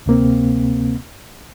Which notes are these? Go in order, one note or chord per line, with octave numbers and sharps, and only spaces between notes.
D2 C3 A#3 C4